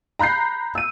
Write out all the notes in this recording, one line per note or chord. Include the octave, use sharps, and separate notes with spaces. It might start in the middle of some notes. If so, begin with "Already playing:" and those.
A#5 B5 F#6 G6 C7
E6 D#7